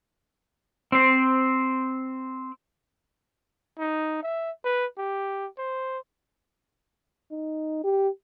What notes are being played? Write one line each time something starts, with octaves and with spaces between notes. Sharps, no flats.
C4 C5
D#4
E5
B4
G4
C5
D#4
G4